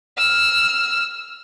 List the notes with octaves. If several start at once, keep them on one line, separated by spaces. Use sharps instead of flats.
E6 F6